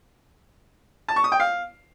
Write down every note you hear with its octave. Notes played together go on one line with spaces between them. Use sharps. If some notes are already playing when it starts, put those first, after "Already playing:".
A5
C#6
D#6
G5
F5